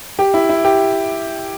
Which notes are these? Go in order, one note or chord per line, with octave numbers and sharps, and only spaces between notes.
G4
E4
E4
G4